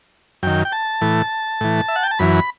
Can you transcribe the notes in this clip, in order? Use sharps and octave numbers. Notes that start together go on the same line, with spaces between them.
F#2 D#3 G5
G5
A5
A2 E3
A2 E3
E5
F#5
G5
A5
F#2 E3 B5